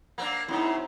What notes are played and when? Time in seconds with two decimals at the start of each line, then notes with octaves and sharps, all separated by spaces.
0.18 A#3 C4 D4
0.48 F#2 C#3 C4 D#4 E4